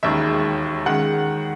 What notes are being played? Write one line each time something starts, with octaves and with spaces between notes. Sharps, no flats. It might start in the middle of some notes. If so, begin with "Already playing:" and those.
E1 D#2 D#3 G#3 E5
D#3 G#3 F#5